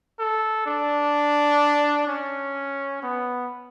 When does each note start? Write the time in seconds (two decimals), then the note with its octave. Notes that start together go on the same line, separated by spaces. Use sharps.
0.19 A4
0.66 D4
2.07 C#4
3.03 B3